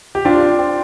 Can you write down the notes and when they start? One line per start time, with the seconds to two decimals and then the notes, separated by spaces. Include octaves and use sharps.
0.15 G4
0.25 C4 D4 F4
0.59 C4